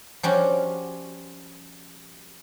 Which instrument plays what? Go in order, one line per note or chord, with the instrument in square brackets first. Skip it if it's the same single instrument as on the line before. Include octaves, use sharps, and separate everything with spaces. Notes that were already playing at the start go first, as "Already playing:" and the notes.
[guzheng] F3 G3 C#4 F#4